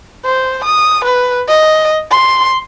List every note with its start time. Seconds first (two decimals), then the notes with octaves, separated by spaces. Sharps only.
0.25 C5
0.64 D#6
1.05 B4
1.48 D#5
2.11 C6